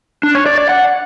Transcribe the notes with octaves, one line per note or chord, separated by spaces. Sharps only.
D4
C#5
D5
D5
F#5